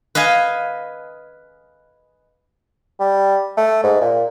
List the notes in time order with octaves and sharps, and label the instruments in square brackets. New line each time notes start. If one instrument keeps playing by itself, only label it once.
[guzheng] B4 D#5 F5 G#5
[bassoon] G3
A3
G#2
A#2